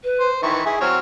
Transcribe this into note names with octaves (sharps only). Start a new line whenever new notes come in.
B4
C5
D#3 E3 E5 C#6
E4 G#4
F#3 C4 C#5 F6